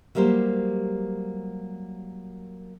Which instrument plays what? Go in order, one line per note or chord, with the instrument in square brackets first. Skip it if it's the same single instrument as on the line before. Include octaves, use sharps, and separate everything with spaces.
[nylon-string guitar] F#3 G3 A#3 G4 C5